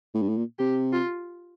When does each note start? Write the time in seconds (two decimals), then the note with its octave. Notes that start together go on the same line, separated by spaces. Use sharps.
0.14 A2
0.22 G2
0.29 A2
0.37 A#2
0.59 C3 G4
0.93 F4